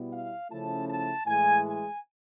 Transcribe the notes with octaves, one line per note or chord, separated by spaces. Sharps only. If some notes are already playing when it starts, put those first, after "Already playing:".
Already playing: B2 G3 B3 E4
F5
C#3 F3 A3 C#4 E4 A5
A5
A2 E3 G#3 G#5
G#5